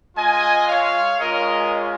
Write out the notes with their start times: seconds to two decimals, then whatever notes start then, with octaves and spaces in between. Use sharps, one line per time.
0.16 G#3 F4 D#5 G#5
0.68 C#5 F5
1.19 G#3 C#4 F4 A#4 D#5